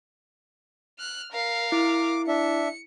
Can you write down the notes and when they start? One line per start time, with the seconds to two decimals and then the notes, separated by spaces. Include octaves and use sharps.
0.99 F6 F#6
1.32 A#4 F5
1.72 E4 D6
2.28 D4 E5 C#7